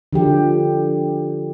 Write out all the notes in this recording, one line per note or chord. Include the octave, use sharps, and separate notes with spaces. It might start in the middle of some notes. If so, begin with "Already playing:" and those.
D3 F3 G4